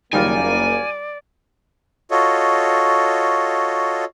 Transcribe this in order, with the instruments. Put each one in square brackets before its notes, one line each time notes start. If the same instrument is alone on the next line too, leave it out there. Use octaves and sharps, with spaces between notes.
[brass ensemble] F#1 A#3 [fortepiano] D#3 G3 F4 [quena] D5 [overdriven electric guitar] G#5
[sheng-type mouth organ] F4 F#4 A4 C#5 D#5